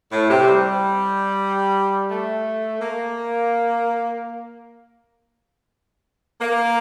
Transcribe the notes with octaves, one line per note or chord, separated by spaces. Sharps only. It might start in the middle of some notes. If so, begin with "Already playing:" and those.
A2
C3
G3
A3
A#3
A#3